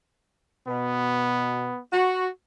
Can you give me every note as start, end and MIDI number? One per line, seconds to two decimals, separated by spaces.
0.68 1.70 47
0.68 1.80 59
1.92 2.27 66